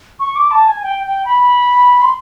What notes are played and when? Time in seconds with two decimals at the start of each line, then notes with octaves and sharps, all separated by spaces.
0.20 C#6
0.36 D6
0.51 A5
0.68 G#5
0.83 G5
1.04 G5
1.25 B5
2.02 C6